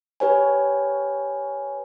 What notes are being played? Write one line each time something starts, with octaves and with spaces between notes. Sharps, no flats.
G4 B4 C#5 G#5